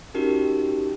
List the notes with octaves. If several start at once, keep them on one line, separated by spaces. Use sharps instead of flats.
C#4 D#4 F#4 G4 A#4